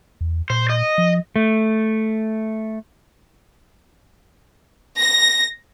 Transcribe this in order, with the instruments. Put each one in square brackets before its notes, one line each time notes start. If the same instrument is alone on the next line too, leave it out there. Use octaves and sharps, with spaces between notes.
[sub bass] E2
[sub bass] A#2 [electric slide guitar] C5
[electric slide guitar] D#5
[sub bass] F3
[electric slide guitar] A3
[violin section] A#6